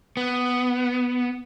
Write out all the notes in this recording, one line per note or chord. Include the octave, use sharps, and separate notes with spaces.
B3